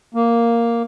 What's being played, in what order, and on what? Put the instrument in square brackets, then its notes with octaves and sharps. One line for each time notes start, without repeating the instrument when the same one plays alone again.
[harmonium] A#3